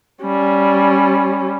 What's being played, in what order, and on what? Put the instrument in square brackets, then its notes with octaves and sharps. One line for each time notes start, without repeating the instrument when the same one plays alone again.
[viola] G3 C#4